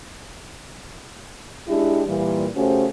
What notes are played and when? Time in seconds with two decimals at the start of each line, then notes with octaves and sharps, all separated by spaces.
1.68 G#3 D4 E4 G4
2.07 A#2 E3 G3
2.55 C#3 A3 C#4 F#4 G4 C5